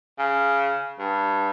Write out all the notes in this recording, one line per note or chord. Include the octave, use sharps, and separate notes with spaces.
C#3
G2